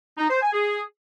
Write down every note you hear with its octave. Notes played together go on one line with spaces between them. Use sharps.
D#4
C5
G#5
G#4